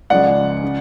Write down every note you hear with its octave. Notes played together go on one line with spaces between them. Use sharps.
C#2 C#3 F3 G#3 D5 F#5
C#3